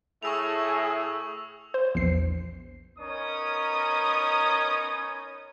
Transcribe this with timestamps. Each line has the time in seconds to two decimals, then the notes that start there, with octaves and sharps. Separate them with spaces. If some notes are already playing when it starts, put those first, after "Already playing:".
0.23 A2 A3 G#4 C#6 E6 F7
1.74 C5
1.95 A#1 E2 C7
2.99 B3 C#4 D#4 A#4 C#5 D#6